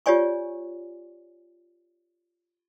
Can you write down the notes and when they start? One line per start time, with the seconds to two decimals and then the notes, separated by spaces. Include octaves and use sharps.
0.06 F4 G4 C#5 D5 G#5 C#6